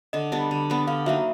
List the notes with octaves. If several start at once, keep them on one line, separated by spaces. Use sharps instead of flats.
D3 D#5
G3 B3 D4
D3
G3 B3 D4
D3 F5
F#3 A#3 D#4 E5